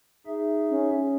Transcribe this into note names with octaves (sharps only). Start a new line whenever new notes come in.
D#4 G#4 E5
C#4